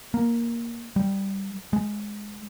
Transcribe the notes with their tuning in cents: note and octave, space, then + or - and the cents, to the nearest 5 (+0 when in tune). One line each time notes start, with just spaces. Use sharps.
A#3 +5
G3 -5
G#3 +0